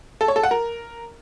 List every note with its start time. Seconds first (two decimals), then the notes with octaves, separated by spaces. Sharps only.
0.21 A4
0.28 C#5
0.36 A4
0.43 F#5
0.51 A#4